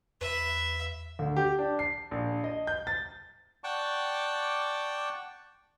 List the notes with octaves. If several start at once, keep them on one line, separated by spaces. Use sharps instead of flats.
E2 B4 E5
D2
G4
D4
C7
A#1
D#5
G6
A6
D5 F#5 G5 A5 C#6 D6